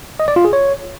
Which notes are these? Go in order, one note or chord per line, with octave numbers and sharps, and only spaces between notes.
D#5
D5
F4
G#4
C#5